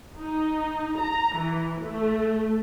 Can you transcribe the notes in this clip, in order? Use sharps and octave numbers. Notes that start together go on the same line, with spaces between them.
D#4
A#5
E3
A3